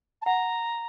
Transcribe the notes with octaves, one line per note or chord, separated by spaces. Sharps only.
A5
F#5 A#5